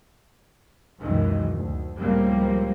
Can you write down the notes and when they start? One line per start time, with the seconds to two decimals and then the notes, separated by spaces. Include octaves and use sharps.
0.99 C#2 F#2 B2 D#3 E3
1.53 D2
1.99 C#2 A2 F3 G3 A#3 C4